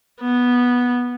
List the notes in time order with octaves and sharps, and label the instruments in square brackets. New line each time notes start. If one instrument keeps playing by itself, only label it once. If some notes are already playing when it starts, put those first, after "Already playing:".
[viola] B3